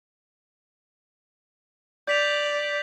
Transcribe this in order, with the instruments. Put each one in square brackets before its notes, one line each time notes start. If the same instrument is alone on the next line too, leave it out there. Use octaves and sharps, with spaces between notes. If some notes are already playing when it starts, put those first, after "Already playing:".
[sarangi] D5 [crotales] G6 B6 F7